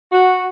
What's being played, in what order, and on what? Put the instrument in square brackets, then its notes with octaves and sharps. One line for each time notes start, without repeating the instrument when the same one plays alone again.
[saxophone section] F#4